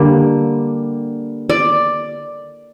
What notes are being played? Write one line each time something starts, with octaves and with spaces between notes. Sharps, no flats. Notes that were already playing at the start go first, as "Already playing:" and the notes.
Already playing: D3 G3 A#3
D5